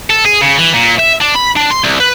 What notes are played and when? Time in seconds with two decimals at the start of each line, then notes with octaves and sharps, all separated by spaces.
0.10 A4
0.25 G#4
0.41 C#3
0.58 E3
0.74 A#2
0.98 E5
1.20 D4
1.35 B5
1.56 D4
1.70 C6
1.84 C2
2.00 B4